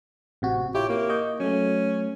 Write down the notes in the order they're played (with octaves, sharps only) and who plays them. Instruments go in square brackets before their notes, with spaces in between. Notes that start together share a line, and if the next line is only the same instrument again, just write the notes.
[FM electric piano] A1 C3 F#4
[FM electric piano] E4 F4 C#5 [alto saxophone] G4
[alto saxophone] A#3
[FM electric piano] D#5 C#6 G6
[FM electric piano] F#3 A3 [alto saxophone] C#4